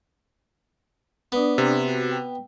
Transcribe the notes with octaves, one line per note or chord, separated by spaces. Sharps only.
B3 D4 D5 D#6
C3
F#4
G5